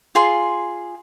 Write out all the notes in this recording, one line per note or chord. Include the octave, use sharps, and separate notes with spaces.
F4 G#4 C6